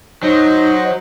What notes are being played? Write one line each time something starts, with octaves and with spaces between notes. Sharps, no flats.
F#3 D#4 C5 D#5